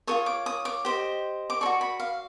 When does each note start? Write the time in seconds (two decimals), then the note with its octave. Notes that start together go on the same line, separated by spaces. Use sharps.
0.07 F4 A4 C#5 D#6
0.26 D6
0.46 D#6
0.65 D6
0.85 G4 C5 D#5
1.50 D6
1.61 A4 D5 C#6
1.66 F#4
1.81 B5
2.00 F5